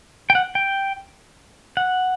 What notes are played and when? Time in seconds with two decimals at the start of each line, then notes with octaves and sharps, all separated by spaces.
0.30 G5
0.35 F#5
0.55 G5
1.77 F#5